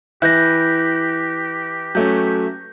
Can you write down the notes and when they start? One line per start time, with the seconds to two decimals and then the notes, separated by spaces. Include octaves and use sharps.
0.22 E3 E4 G4 F#6 G6 A#6
1.95 F#3 A3 C#4 G6